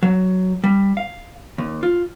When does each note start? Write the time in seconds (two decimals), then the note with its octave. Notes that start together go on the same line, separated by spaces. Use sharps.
0.03 F#3
0.64 G3
0.97 F5
1.58 D#2
1.83 F4